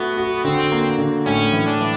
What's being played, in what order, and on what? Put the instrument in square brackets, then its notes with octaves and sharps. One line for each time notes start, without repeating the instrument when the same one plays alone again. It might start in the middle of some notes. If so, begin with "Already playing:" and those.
Already playing: [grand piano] A3 F#4 [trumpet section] B3
[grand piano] F#4
[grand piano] D3 [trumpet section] C4
[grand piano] A#3
D3
[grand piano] A2 [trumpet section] C#4
[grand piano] E3
[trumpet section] D4
[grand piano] E3